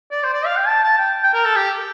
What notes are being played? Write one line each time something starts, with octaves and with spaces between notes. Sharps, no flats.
D5
C5
D5
F5
G5
A5
A5
G5
G5
A#4
A4
G4